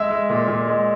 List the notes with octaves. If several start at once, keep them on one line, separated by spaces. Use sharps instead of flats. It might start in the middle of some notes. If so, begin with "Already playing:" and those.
Already playing: G#3 E5 E6
G#3
A#2
A#2
G#3